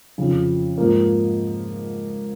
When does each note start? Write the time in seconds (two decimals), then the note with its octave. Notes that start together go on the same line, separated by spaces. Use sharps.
0.18 F2 C#3 F3
0.78 G#2 F3 A#3